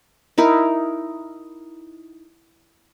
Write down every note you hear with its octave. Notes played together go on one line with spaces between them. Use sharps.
D#4 E4 A#4